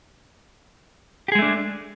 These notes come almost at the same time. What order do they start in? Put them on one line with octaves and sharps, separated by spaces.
G4 G#4 G#3 A3 D4